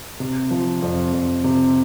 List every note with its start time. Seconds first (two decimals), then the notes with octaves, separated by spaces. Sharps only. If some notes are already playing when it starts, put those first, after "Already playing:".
0.20 C3
0.51 F3
0.82 F2
1.13 F2
1.44 C3